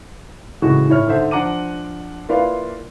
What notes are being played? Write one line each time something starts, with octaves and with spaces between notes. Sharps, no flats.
A2 C#3 E3 G#3 F#4
A2 E4 C#5 F6
G#2 D3 C5 E5
F3 D4 F#5 A#5 D6 D#7
A#3 E4 F4 B4 D5 F5